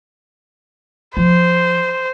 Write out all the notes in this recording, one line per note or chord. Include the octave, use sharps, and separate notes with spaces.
F3 C5